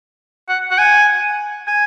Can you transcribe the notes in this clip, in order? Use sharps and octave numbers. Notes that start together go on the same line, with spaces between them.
F#5
F#5
G#5
G#5